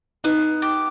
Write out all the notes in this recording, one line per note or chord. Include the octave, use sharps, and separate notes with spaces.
B3 D#4
G4